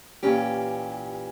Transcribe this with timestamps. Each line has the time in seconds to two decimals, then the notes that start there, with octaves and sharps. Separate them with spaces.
0.23 A#2 E3 C#4 G4